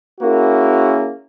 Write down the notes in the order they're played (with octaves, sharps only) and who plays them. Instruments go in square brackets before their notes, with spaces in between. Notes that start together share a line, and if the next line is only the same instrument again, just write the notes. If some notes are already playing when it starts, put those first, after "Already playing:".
[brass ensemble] A#3 C#4 E4 F#4 G#4 A#4